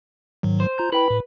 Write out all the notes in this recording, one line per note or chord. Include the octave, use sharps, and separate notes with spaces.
G#2 D#3 F#3
C5
F4 A#5 G6
E4 B4 G5 B5
A2